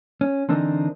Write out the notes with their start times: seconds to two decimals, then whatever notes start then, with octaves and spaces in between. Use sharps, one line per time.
0.21 C#4
0.49 D3 E3 C4 D4 D#4 A#4